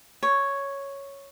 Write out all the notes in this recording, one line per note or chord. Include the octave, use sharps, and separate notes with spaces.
C#5